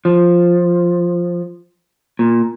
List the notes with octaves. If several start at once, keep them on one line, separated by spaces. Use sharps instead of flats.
F3
A#2